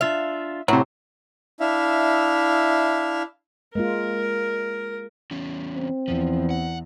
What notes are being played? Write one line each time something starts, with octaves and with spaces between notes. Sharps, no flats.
D4 F4 E5 F5
A2 C3 F#3 E4
D4 E4 E5 F5
G#3 A#3 F4 A#4
E2 C#4
C4
E2 F3
F#5